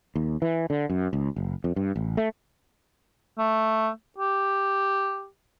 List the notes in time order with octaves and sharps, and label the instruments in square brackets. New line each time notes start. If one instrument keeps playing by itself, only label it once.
[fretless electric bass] D#2
E3
D3
F#2
C#2
F#1
F2
G2
A1
A3
[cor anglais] A3
G4